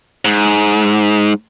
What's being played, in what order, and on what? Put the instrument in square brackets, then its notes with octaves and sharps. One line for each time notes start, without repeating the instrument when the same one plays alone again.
[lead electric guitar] G#2